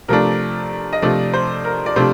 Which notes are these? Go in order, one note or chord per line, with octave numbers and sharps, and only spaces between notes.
C3 F3 A3 D4 A#4
D#5
C3 F3 A3 D4 D5
C5
A#4
D5
C3 F3 A3 D4 C5